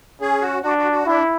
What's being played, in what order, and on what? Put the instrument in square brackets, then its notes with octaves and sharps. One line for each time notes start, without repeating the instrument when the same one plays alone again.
[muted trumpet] C#4 [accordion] G#4
[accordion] F#4
[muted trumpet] D4 [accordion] F#4
[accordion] F#4
F#4
[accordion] D4 [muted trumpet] E4